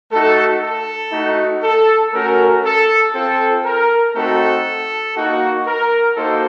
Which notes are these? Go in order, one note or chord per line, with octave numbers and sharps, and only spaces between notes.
A3 D#4 F#4 A4
A4
A3 D#4 F#4
A4
A3 C#4 F#4 A#4
A4
C4 F4 A4
A#4
A3 C4 D#4 F#4 A4
A#3 D#4 F#4
A#4
A#3 D#4 F#4 A4 C5